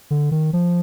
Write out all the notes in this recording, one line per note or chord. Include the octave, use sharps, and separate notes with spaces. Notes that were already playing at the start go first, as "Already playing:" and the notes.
D3
D#3
F3